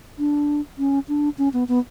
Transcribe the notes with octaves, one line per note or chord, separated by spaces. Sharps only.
D4
C#4
D4
C#4
B3
B3